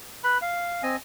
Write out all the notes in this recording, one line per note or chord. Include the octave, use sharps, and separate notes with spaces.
B4 B5
F5
C4 D#5 G#5